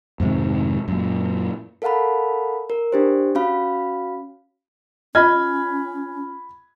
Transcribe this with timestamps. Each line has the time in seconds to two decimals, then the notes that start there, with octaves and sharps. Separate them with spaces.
0.20 F2 G#2 C3 D#3
0.88 F#2 A#2
1.82 A4 A#4 F5 F#5 A5 B5
2.70 A#4
2.92 D4 G4 C5
3.35 C#4 F#4 F5 B5
5.15 C#4 F4 D#5 B5 F6 G#6